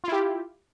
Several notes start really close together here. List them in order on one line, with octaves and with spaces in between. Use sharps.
F4 E4 G4